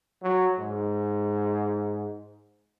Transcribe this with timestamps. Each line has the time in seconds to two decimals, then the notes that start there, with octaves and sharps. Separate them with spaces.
0.23 F#3
0.59 G#2